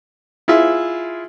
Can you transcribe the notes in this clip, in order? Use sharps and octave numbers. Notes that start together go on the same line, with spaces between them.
E4 F4 G#4 E5